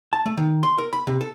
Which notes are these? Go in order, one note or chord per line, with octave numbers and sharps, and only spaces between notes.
A5
A3
D#3
C6
A#4
B5
C3
A4